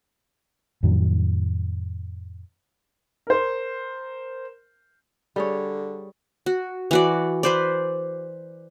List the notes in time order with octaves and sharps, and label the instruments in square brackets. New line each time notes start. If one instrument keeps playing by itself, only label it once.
[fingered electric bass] F2 A2 D#3 F#3
[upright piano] A#4 C5
[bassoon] D3 [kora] G3 G#4 C#5
[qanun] F#4
E3 F#4 D5
B4 C5 D5